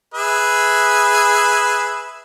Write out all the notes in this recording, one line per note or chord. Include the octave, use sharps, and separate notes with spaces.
G#4 B4 E5